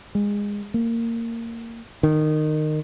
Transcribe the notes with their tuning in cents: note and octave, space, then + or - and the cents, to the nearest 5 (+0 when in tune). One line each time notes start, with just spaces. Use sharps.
G#3 -20
A#3 -20
D#3 -20